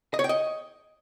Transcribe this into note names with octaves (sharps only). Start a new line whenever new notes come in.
D#5
C#5
G5
D#5